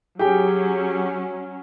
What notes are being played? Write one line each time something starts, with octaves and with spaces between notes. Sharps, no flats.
F#3 C#4 G4 G#4 G5